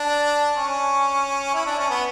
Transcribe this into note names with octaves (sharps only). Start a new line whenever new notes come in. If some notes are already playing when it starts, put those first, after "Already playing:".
Already playing: D4
C#4
E4
D4
C#4
B3